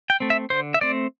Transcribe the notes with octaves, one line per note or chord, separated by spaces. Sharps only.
G5
A3 C4
E5
D3 C5
E5
A3 C4 D5